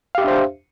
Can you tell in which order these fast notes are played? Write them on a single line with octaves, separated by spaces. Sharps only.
F5 G4 E5 D4 C5